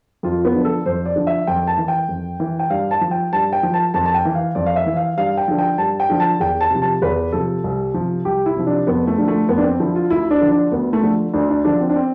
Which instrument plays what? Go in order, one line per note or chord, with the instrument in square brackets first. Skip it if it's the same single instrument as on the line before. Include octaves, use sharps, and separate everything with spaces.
[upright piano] F2 F4
B3
D3 F3
A4
F2 C5
D5
D3 F3
E5
F2 G5
A5
E3
G5
F2
E3
G5
G2 F5
A5
F3
G5
G2 A5
G5
F3
A5
F2 A5
A5
G5
E3
F5
F2 D5
F5
E5
E3
F5
G2 F5
G5
D3 F3
G5
G2 A5
G5
D3 F3
A5
E2 G5
A5
C3 F3
A5
E2 B4
C3 F3 A4
C2
C3 F3
C2 G4
E4
C3 F3
D4
F2 B3
A3
D3 F3
A3
F2 B3
D4
C4
D3 F3 E4
F4
D2 E4
D4
D3 F3
D4
D2 B3
A3
D3 F3
D2 D4
D4
D3 F3 D4
C4
D4
C4